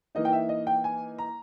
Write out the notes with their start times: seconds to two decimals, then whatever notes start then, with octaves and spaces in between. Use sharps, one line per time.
0.15 E3 A#3 D#4 D#5
0.25 G5
0.33 E5
0.49 D#5
0.67 G5
0.84 G#5
1.18 A#5